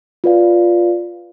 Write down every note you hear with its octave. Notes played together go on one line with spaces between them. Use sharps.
F4 B4 D5 F5